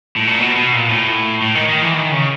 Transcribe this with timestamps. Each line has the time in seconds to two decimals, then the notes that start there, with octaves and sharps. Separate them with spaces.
0.17 A2
0.27 A#2
0.39 B2
0.56 B2
0.73 A#2
0.90 A2
1.42 A2
1.55 D#3
1.68 D#3
1.82 E3
1.94 D#3
2.11 C#3